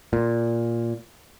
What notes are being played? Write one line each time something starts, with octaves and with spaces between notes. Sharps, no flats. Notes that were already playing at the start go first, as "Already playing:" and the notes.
A#2